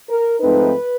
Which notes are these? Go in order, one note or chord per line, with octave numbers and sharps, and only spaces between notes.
A#4
G#2 F3 A3 C4 D#4 B4